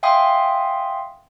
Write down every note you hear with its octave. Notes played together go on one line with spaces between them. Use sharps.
E5 F5 G5 G#5 C6 D#6